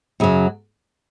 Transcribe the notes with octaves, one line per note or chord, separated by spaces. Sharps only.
F#2 C#3 F#3